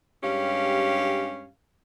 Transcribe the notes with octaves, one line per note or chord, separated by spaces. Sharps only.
G2 G#3 C#4 G4 F5